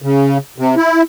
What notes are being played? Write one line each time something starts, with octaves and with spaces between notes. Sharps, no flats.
C#3
C3
E4